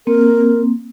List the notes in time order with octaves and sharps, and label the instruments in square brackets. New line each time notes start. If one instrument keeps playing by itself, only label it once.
[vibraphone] A#3 C4 [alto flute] A#4